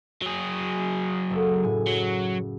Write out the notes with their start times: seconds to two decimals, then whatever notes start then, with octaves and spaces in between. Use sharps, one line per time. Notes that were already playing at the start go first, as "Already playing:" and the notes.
0.22 F#3 G#4
1.30 F#1 A4
1.63 A2 G#5
1.87 F#3